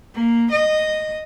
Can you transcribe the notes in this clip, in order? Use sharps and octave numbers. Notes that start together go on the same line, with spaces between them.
A#3
D#5